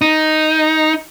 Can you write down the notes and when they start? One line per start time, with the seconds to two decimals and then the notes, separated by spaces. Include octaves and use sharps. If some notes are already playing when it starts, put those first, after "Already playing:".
0.01 D#4